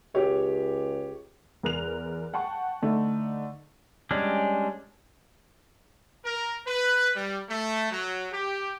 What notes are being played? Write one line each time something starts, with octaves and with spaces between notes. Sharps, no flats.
C#2 G4 C#5
E2 A#4 F#6 F7
F#5 G5 A5 C#6
D3 A3 D#4
G3 G#3 C#4 D4
A#4
B4
G3
A3
F#3
G4